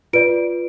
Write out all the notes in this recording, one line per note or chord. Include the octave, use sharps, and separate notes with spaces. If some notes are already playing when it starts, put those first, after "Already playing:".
F4 B4 D5 D7